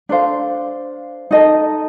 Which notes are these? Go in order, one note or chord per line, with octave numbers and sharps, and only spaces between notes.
D4 A4 C5 F5
D#4 A4 D#5 A5